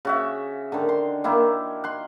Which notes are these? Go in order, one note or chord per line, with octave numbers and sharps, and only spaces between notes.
C#3 F#4 E5
D3 D#3
C6
D#3 A#3 E4
F#5 C6